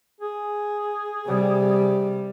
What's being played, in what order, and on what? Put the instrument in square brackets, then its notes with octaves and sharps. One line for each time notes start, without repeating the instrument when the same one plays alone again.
[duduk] G#4
[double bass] C3 G3